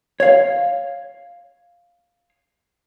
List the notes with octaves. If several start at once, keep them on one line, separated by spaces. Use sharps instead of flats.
C#5 F5